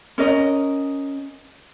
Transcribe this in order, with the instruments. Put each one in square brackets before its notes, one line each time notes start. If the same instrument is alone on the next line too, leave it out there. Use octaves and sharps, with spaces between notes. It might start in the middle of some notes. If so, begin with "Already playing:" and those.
[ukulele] C#4 A#4 D#5